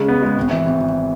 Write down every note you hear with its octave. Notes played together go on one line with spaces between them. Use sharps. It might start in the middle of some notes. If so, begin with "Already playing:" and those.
Already playing: C#3 G#3
B3
G#3
G#1
E3
G#1
G#1